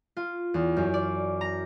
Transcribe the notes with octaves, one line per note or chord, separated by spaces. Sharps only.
F4
E2
F#2
D5
A#5